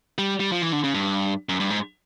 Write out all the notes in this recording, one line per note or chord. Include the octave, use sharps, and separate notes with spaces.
G3
G3
F3
E3
D3
C#3
G2
F#2
G2
G#2